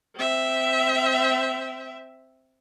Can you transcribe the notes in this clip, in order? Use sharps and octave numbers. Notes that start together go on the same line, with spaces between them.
C4 E5